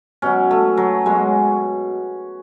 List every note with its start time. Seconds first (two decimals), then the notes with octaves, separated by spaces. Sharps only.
0.22 B2 F#3 C#4
0.51 A3
0.77 F#3
1.05 B2 F#3 G#3